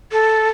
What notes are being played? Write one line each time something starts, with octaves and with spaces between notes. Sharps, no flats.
A4